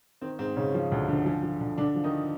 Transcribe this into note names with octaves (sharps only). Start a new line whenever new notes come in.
D#3 C4
G#2 C4
G#2 C#3 C#4
F3
D2
D3
F3
F3
D3
D3 D4
F3
D#3 D#4